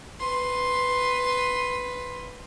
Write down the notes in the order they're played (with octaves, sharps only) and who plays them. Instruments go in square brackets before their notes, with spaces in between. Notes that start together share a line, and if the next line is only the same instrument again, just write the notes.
[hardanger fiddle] B4 C6